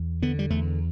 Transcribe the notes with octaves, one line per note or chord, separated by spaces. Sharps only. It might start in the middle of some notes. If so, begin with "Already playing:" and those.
Already playing: E2
D3 B3
G3
E2 A3